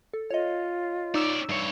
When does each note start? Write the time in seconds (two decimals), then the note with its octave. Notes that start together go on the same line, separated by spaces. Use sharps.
0.14 A4
0.31 F4 C#5 D#5
1.14 C#4 D#4 D5 E6 E7
1.49 G2 C#5